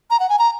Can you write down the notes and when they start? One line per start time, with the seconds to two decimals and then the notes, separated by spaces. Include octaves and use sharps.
0.10 A#5
0.20 F#5
0.29 G#5
0.39 A#5